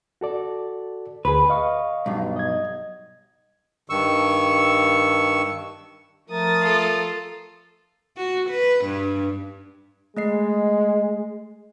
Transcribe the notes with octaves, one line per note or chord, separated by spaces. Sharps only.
F#4 A4 D5
D2 G#4 B4
D#5 F5 C#6
B1 G2
D#5 G#6
G2 D#3 C#6 E6
F3 A3 A#4 D#6 A6
F4 A4
F#4
B4
G2
G#3 A3 D#5 C7